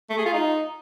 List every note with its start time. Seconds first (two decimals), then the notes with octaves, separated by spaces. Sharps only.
0.10 A3
0.18 G#4
0.26 F4
0.33 D#4